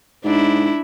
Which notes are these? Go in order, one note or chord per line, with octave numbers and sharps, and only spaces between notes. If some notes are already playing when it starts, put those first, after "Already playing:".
G#2 D4 E4